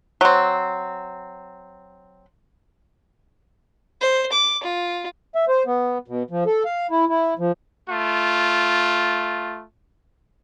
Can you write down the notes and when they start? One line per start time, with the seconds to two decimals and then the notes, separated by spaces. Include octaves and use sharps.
0.21 F#3 C4
4.01 C5
4.32 D6
4.63 F4
5.35 E5
5.49 C5
5.66 B3
6.08 B2
6.31 F3
6.46 A4
6.65 F5
6.91 E4
7.09 E4
7.39 F3
7.88 A3 F4